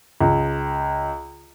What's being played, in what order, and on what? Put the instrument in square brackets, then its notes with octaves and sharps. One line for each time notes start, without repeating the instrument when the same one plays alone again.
[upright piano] C#2